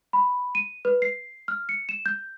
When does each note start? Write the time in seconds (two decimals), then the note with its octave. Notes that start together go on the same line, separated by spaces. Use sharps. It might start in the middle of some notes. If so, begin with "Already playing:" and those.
0.13 B5
0.55 D#7
0.85 B4
1.02 C7
1.48 F6
1.69 C#7
1.89 E7
2.06 G6